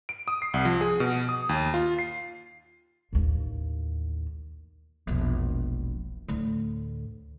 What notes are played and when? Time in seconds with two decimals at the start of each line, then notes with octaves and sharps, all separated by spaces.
0.09 D7
0.28 D#6
0.42 C7
0.54 C2
0.65 F3
0.81 G#4
1.00 B2
1.29 D#6
1.49 D#2
1.74 F4
1.99 C7
3.13 A1 D#2
5.07 E1 A#1
6.28 D2 A2